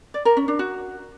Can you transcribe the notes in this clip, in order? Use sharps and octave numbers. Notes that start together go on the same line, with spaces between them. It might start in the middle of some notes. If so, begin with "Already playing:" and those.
D5
A#4
C#4
D4
F#4